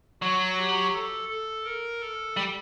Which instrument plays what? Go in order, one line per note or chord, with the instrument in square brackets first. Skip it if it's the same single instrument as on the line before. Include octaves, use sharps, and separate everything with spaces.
[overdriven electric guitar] F#3 [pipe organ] F#4
[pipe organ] G4
A4
A4
A#4
A4
[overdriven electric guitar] G3